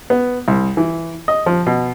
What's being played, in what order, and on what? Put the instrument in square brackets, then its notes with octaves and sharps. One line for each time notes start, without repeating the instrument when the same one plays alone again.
[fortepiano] B3
C2
E3
D#5
F3
B2